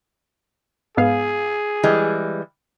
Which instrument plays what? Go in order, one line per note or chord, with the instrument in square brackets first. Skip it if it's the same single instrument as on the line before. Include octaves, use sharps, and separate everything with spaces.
[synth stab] G#2 B3 F5 [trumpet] G#4
[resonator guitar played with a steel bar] E3 G3 G#3